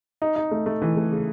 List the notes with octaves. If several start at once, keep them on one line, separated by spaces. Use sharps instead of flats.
D#4
D#4
A3
A3
E3
A3
C#3